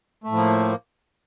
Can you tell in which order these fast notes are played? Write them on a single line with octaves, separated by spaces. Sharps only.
A3 A2 F3 A#3